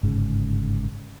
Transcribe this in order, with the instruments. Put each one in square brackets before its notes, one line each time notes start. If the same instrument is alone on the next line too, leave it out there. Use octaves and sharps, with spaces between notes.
[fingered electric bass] G1 G#2 C#3